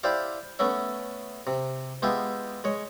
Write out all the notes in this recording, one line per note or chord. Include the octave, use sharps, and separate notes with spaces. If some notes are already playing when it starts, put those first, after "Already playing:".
E4 G4 C5 D5 F5
A3 B3 C#4 E5
C3
G#3 B3 F4 G4 E5
G#3 C#5